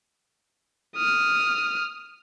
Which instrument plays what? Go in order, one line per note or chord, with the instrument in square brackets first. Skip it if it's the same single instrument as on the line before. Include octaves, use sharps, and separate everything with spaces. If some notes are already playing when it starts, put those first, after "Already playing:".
[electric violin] D#6 F6